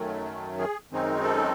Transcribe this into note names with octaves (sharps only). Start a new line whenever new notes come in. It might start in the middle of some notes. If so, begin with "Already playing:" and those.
Already playing: F#2 D#3 F#3 A3
G#4
F#2 D#3 G#3 C4 D#4
A4